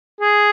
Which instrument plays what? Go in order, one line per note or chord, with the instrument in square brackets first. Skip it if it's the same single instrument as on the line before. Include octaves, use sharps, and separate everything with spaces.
[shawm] G#4